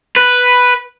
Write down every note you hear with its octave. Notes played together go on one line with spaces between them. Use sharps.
B4